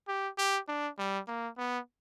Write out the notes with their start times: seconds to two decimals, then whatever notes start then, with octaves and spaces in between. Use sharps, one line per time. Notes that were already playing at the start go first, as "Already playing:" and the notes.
0.08 G4
0.38 G4
0.68 D4
0.99 G3
1.28 A#3
1.58 B3